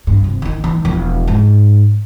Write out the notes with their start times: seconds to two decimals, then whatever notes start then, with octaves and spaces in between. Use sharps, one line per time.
0.07 G2
0.24 F1
0.42 D#3 D#4
0.64 E3 D#4
0.85 E1 F2
1.28 G#2